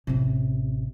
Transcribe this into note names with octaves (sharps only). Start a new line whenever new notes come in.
A1 C3